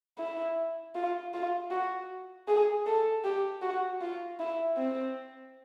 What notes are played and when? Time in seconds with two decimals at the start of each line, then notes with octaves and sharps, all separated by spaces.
0.18 E4
0.95 F4
1.33 F4
1.71 F#4
2.48 G#4
2.86 A4
3.24 G4
3.62 F#4
4.01 F4
4.40 E4
4.77 C4